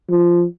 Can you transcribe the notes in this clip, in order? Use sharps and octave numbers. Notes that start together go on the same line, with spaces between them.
F3